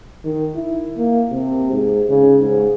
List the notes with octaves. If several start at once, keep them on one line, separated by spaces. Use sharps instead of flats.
D#3
E4
A#3
C3
G#2
C#3
G#2